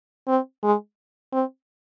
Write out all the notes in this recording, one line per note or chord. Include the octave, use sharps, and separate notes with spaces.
C4
G#3
C4